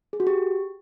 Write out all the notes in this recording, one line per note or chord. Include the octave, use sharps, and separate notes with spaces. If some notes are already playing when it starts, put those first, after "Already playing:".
G#4
F#4
G4